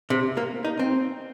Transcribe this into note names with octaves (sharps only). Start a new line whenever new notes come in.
C3
A#3
D#4
C4